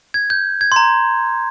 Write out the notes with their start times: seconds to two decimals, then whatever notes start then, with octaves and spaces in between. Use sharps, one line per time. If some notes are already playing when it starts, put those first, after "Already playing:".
0.14 G#6
0.30 G6
0.61 G#6
0.72 C6
0.76 A#5